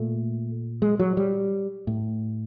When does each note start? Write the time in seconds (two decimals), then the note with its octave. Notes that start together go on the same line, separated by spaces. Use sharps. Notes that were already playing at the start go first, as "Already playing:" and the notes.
Already playing: A#2 A3
0.82 G#3
0.99 F#3
1.17 G3
1.87 A2